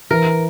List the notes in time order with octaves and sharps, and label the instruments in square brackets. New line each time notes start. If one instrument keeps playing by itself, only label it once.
[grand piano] E3 [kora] A#4